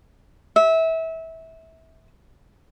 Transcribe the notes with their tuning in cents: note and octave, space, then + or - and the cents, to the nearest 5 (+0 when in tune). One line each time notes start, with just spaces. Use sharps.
E5 -25